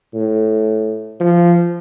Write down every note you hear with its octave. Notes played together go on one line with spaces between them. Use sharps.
A2
F3